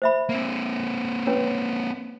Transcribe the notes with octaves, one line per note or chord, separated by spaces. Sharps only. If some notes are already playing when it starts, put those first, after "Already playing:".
C5 E5 B5
A#3 C4
C#4 B4 C#5